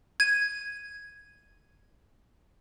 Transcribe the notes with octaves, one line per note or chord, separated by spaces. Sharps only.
G#6 D#7